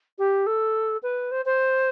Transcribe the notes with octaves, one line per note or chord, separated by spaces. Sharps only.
G4
A4
B4
C5
C5